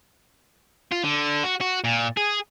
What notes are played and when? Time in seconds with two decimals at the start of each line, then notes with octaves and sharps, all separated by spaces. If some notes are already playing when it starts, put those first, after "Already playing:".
0.92 F4
1.04 D3
1.44 F#4
1.61 F#4
1.84 A#2
2.17 G#4